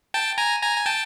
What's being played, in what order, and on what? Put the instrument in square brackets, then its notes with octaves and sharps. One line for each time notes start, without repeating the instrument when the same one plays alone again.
[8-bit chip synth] G5 A5
G#5 A#5
G#5 A#5
G#5
G5 A5